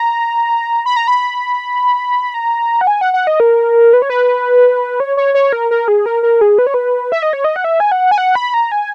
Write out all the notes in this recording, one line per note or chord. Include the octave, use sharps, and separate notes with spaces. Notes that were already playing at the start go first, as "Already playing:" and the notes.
Already playing: A#5
B5
A#5
B5
A#5
F#5
G#5
F#5
F#5
D#5
A#4
B4
C#5
B4
C#5
C#5
C#5
A#4
A#4
G#4
A#4
A#4
G#4
B4
C#5
B4
E5
D#5
C#5
D#5
F#5
E5
G#5
F#5
G#5
F#5
B5
A#5
G#5